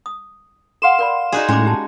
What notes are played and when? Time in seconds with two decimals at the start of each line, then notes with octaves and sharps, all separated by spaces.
0.06 D#6
0.82 A4 F5 F#5 C6 E7
0.99 A#4 D5 B5
1.32 D#4 F#4 G#4 D5
1.48 A2 G#3 C#4 D6
1.66 G4 A5